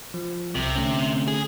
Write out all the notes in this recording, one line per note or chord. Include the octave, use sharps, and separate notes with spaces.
F3
C2 C3
D3 A3 C#4
G#4